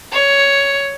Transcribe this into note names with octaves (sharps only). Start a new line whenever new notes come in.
C#5